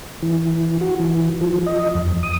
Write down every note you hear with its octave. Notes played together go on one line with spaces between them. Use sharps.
E3
F#4
E3
F3
D#5
F2
D#6